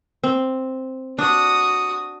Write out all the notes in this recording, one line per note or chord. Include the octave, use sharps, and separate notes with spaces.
C4
D4 F#4 D#6